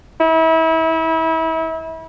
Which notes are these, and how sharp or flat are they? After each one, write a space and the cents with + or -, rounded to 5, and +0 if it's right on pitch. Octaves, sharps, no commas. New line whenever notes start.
E4 -30